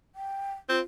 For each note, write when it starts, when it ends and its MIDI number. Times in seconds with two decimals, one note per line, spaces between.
0.15 0.52 79
0.69 0.80 60
0.69 0.80 65